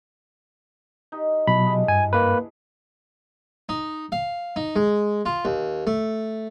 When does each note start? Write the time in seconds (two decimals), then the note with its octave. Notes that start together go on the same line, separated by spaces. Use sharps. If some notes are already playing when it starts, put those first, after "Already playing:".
1.12 D#4 G4
1.47 B2 F#3 D4 E4 B5
1.65 G#3 G4 A#5
1.88 G2 G#5
2.13 A#3 B4
3.69 D#4
4.12 F5
4.56 D#4
4.76 G#3
5.26 F4
5.45 D#2
5.87 A3